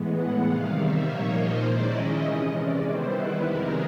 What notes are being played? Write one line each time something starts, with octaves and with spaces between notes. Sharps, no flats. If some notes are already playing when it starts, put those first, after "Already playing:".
Already playing: A2 E3 G#3 B3
F#5
C3 D#3 G3 F5
E5
A#2 F3 A#3 D#4 C#5
C5
D#3 G#3 C#4 E4 D5
D#5
C3 E3 G#3 C#4 D#5
D5
D#3 G3 B3 E4 C5
B4
F2 C3 D#3 G#3 A#4